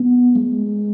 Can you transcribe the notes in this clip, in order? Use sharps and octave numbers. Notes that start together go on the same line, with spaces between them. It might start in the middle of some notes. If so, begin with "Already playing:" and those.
Already playing: B3
G#3